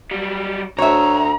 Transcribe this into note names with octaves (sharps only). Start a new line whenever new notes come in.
F#3 G3
D2 C#5 E5 A#5